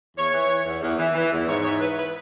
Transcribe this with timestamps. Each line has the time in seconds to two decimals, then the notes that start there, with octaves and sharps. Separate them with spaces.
0.17 E2 C#5
0.33 E3
0.49 E3
0.66 E2
0.82 E2
0.98 E3
1.15 E3
1.32 E2
1.48 G#2 C#5
1.64 E3 C#5
1.81 E3 B4
1.98 B4